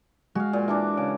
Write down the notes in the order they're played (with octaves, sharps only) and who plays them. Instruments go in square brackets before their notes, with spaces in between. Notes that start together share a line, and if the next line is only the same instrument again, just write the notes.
[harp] G#3 [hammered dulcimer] F#4 F5
[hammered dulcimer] A#2
E3 D4 D6
[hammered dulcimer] C#3 [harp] D7